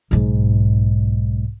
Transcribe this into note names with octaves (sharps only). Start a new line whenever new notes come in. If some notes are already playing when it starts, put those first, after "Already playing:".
B1 G#2